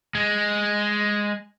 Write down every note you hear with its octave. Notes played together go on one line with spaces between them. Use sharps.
G#3